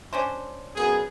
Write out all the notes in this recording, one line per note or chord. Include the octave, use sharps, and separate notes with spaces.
C#4 D4 C5
F#2 B3 G#4